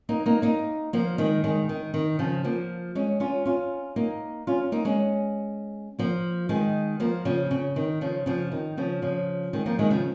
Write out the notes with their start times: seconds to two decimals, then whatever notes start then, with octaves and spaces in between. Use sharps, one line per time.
0.09 A#3 D#4
0.26 A#3 D#4
0.42 A#3 D#4
0.93 F3 A#3
1.18 D#3 G#3
1.44 D#3 G#3
1.69 D#3
1.94 D#3
2.19 C#3 F3
2.44 F3 A#3
2.95 G#3 C#4
3.20 C#4 F4
3.45 C#4 F4
3.96 A#3 D#4
4.47 C#4 F4
4.72 A#3 D#4
4.85 G#3 C#4
5.99 F3 A#3
6.49 D#3 G#3
7.00 F3 A#3
7.25 C#3 F3
7.51 C#3
7.76 D#3
8.01 C#3 F3
8.26 C#3 F3
8.52 D#3
8.77 C#3 F3
9.02 C#3 F3
9.53 D#3 G#3
9.66 F3 A#3
9.79 D#3 G#3
9.90 C#3 F3